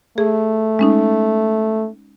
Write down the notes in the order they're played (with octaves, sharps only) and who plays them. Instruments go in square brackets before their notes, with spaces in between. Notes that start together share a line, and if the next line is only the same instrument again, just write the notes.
[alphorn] A3 [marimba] G#4
[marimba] G#3 C#4 D#4